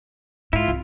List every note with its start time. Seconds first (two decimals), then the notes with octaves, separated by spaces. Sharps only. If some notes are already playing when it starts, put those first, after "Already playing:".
0.53 G#2 E4 F4
0.68 C2